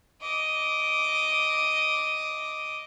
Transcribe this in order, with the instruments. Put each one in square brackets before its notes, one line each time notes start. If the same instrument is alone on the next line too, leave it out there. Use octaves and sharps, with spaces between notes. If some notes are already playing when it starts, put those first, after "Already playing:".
[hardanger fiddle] D#5 D6